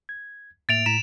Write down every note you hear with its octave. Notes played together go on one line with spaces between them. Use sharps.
G#6
A2 A#3 E5 A6 D7 F7
A2 A#5 B6 E7